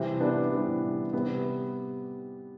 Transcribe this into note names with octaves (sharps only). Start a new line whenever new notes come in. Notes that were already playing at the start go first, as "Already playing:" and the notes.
Already playing: C3 E3 G3 C4
B3 D4
C3 E3 G3
C3 G3 B3